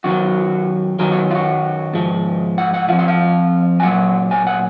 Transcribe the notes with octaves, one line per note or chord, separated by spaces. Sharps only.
F#2 D#3 F#3 F#4
F#2 D#3 F#3 A#4
F#4
F4
F#4
G#2 F3
F#5
F#5
F2 F3 F5
F#5
F5
G#5
A#2 F#3 F#5
G#5
F#5